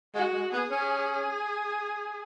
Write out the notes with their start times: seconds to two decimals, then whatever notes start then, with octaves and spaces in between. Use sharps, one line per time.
0.15 G#3 F#4
0.34 G#3
0.53 B3 G#4
0.71 C#4